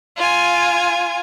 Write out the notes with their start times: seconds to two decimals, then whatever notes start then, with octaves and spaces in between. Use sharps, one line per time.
0.17 F4 G#5